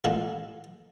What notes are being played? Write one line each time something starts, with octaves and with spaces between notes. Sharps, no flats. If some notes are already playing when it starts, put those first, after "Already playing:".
A1 A#2 G#3 B3 A4 F5